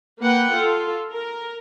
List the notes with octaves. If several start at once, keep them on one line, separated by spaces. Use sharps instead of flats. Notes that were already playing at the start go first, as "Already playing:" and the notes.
A#3 B4 F#5 G5
F4 A4
A#4